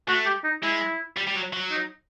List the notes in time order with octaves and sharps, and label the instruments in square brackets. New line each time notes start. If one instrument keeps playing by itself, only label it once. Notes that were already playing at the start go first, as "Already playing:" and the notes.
[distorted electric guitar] A3 [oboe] F#4
[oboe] G4
D#4
[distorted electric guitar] G#3 [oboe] E4
[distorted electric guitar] G3
G3
F#3
F#3
[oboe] D#4